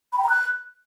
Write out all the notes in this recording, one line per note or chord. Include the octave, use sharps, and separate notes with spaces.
B5
G5
A#5
F#6